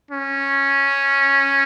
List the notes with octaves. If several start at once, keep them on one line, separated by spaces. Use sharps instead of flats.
C#4